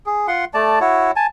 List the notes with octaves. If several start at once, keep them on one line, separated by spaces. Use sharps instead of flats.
G#4
F4 F#5 C6
A3 D5 A5
E4 F#4 C#5
G#5 A5